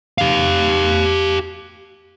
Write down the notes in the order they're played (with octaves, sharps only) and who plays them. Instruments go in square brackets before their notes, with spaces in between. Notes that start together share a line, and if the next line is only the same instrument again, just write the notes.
[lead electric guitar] G4 F5